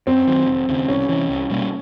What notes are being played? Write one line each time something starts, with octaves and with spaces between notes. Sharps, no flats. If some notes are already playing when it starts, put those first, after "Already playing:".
F#2 C4
D#3 F#3
F1
D#2 C#3
C2 C#4
C3 E3
C2
B2 G3 A#3